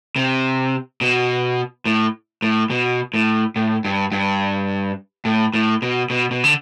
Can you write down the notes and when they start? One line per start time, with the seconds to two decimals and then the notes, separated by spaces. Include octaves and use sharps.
0.16 C3
1.01 B2
1.86 A2
2.42 A2
2.70 B2
3.14 A2
3.56 A2
3.85 G2
4.12 G2
5.25 A2
5.54 A2
5.82 B2
6.10 B2
6.31 B2
6.44 D3